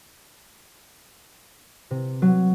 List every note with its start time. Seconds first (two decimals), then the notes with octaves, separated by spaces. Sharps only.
1.91 C3
2.22 F#3